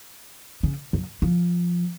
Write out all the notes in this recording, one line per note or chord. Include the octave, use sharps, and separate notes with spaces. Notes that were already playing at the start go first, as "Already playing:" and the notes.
C#3
F#2
F3